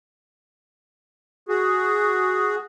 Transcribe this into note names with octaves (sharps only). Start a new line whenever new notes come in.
F#4 G#4